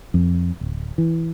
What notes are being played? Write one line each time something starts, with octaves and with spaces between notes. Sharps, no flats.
F2
D1
E3